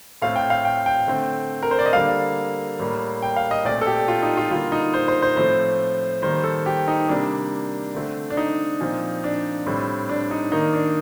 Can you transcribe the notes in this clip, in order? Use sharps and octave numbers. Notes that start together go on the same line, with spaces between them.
A2 A3 C4 F5
G5
F5
G5
G5
D3 A3 C4
A#4
C5
D5
D#5
D3 G3 A#3 F5
A2 G3 A#3
G5
F5
D#5
A#2 A3 C4 D5
A4
G4
F4
D#4
F4
D3 G3 A#3 F4
D#4
C5
C5
C5
A2 F3 A3 C4 C5
D#3 G3 A#3 C5
A4
G4
D#4
C3 G3 A#3 D4
D3 A3 C4
D4
D#4
A#2 F3 C4
D4
A2 G3 C4
D4
D#4
D#3 A#3 D#4
D4